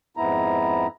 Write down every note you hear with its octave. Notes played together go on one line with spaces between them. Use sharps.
F2 G#2 B3 E4 A#5